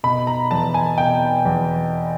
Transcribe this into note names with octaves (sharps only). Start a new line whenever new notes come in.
B2 B5
A#5
E2 A5
G#5
B2 G5
E2